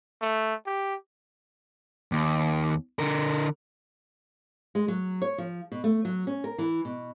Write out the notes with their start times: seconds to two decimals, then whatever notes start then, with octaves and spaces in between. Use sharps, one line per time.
0.22 A3
0.66 G4
2.12 D#2
2.99 D3 A#4
4.75 G#3
4.88 F#3
5.22 C#5
5.38 F3
5.72 B2
5.84 A3
6.05 F#3
6.27 C#4
6.44 A#4
6.58 E3
6.85 B2